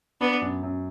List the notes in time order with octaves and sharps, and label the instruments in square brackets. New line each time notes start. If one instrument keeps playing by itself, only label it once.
[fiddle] B3 [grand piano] D4
[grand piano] F#2
F#2